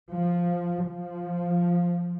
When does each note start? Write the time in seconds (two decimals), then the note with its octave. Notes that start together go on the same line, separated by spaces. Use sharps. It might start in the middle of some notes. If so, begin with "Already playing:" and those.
0.13 F3
0.87 F3